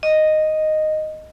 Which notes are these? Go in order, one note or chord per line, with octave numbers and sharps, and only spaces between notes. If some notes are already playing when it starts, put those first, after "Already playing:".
D#5